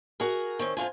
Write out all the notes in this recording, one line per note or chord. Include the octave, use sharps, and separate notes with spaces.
F#4 G#4 A#4
D#3 C4 C#4
F2 G#2 F4 G#5